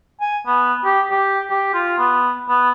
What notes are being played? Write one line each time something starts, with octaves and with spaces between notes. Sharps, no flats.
G#5
B3
G4
G4
G4
F4
B3
B3